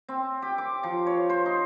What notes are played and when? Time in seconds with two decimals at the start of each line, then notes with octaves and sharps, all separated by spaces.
0.09 C4
0.42 G4
0.58 D6
0.83 F3
1.06 C#5
1.30 C5
1.46 D#4